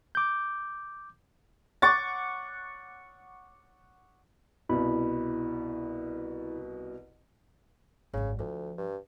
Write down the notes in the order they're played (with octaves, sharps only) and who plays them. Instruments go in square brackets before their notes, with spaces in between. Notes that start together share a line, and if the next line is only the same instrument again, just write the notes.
[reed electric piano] D6 G6
[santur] F#5 C#6 D6 [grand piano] A6
[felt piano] C2 B2 [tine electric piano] E4 B5
[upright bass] G#1 F#2 [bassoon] C#3
[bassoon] D2 [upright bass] F3
[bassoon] G2